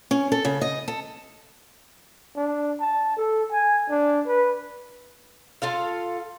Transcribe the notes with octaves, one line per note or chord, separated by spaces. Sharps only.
C#4
A4
C#3
D#5
A4
D4
A5
A4
G#5
D4
B4
F4 A4 F5